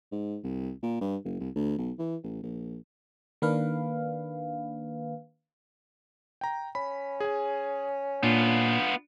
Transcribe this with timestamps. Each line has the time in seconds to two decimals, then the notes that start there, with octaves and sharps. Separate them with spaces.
0.12 G#2
0.43 C2
0.83 A#2
1.01 G2
1.25 F#1
1.40 C2
1.55 D2
1.78 B1
1.99 E3
2.23 A1
2.43 A#1
3.42 D#3 A#3 D4 B4 F5
6.41 G5 A#5
6.75 C#4 B5
7.20 G#4 G#5
8.23 A#2 B3 D4 F4